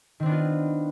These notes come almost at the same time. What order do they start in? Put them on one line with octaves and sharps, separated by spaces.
D#3 C4 D4 B3 F4